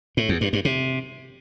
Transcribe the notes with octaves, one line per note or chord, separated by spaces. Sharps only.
A2
E2
G2
G2
C3